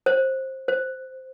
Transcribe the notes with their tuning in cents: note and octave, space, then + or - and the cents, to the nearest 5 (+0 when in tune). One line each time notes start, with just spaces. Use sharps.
C5 +20
C5 -5